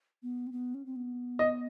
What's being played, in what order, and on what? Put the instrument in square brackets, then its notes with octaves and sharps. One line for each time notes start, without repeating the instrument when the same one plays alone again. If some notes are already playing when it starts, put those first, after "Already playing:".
[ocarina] B3
C4
B3
C#4
C4
B3
[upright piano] D#5